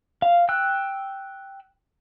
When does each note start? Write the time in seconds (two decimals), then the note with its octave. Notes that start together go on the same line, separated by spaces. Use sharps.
0.22 F5
0.49 G5 E6 F#6